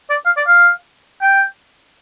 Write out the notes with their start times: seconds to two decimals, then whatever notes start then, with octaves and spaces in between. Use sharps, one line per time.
0.10 D5
0.26 F5
0.37 D5
0.47 F5
1.22 G5